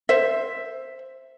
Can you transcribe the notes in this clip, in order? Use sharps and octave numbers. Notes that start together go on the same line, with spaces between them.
C5 E5